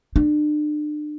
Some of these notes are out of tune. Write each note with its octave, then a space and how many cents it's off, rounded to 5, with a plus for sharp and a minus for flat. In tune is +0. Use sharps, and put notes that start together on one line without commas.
D4 +35